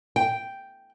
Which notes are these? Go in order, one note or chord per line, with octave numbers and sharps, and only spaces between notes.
G5